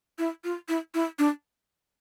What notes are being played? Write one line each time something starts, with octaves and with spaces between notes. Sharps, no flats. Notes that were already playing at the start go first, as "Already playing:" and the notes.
E4
F4
E4
E4
D4